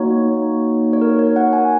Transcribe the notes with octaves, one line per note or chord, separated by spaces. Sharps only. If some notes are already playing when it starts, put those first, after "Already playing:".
Already playing: A#3 D#4 F#4 C#5
C#5
A#4
C#5
F#5
G#5